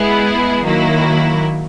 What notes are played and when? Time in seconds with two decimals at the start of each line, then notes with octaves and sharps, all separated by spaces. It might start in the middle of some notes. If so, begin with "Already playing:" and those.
Already playing: G#3 B3 E4 G#4
0.62 D#3 F#3 A#3 E4